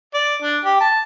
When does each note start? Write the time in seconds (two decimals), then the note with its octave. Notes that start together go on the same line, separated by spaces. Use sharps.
0.14 D5
0.42 D4
0.64 G4
0.81 A5